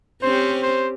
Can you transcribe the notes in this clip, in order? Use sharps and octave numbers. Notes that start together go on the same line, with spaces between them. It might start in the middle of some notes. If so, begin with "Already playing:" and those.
C4 C#4 G4 C5
C5